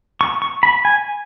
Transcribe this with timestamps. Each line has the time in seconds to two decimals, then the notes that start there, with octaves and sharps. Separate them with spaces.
0.21 C#6
0.42 C#6
0.63 B5
0.85 G#5